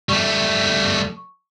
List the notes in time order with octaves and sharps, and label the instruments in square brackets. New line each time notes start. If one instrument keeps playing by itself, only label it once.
[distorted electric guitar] G3 A3 [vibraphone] C#6